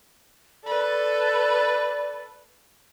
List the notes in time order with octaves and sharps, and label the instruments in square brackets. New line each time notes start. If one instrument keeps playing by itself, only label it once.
[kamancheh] A4 B4 [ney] D5